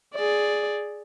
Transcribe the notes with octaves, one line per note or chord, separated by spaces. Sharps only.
G#4 D5